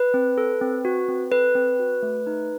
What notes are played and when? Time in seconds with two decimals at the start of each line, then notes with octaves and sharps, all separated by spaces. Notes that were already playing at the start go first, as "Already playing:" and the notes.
Already playing: B4
0.14 C4
0.38 A4
0.61 C4
0.85 F#4
1.08 C4
1.31 A4 B4
1.55 C4
1.79 F#4
2.03 A3
2.27 D#4